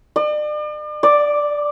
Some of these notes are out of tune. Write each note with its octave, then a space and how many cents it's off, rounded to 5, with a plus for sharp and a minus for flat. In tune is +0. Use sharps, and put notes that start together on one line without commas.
D5 +40
D5 +0